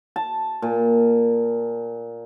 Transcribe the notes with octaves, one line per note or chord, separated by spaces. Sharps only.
A5
A#2